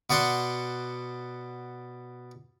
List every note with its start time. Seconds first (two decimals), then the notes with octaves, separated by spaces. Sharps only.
0.10 B2 F#4 D5 F#5 C6